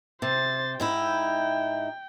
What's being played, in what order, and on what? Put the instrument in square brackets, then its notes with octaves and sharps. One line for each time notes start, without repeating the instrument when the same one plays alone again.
[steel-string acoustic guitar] C3 [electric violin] C5 A6
[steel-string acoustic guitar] G#2 D#4 E4 [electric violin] G5